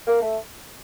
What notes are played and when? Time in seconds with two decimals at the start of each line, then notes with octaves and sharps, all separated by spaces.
0.07 A#3
0.21 A3